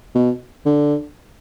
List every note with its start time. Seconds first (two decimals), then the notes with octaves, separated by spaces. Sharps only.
0.15 B2
0.66 D3